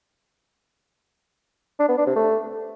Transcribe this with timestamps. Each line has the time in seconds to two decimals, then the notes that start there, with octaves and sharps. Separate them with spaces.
1.80 D4
1.89 B3
1.98 D4
2.07 C3
2.16 A3